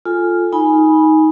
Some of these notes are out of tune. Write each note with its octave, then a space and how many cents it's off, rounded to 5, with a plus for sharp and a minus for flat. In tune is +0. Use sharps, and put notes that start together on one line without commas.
F4 +0 A4 +0 G#5 +0
D#4 +15 G#5 +0 B5 -10